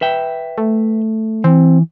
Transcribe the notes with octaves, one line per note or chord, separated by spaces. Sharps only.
B4 E5 G5
A3
E3 C4